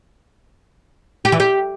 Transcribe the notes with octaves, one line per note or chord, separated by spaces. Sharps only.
G4
E3
G4